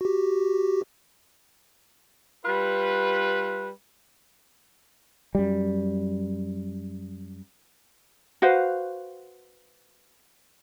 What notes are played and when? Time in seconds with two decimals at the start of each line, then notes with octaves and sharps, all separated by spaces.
0.01 F#4 G4
2.45 G3 F4 B4
5.35 F#2 G3
8.42 F#4 B4 C5 F5